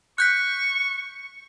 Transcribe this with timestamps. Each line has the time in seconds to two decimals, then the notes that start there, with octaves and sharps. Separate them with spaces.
0.18 C#6 F#6 G6 B6